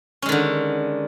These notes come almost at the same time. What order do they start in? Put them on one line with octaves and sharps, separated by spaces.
C#4 G#3 D#3 D3